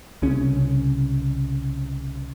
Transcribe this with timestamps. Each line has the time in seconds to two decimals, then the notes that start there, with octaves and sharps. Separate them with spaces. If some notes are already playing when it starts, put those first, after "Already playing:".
0.22 C2 C#3 C#4